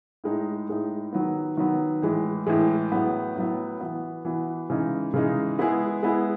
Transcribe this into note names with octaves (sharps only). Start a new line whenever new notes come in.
A2 G#3 D#4
A2 G#3 D#4
D#3 F#3 B3
D#3 F#3 B3
A2 E3 G#3
A2 E3 G#3
A2 F#3 B3
A2 F#3 B3
E3 B3 F#4
E3 B3 F#4
C#3 E3 G#3 D#4
C#3 E3 G#3 D#4
G#3 B3 E4 G#4
G#3 B3 E4 G#4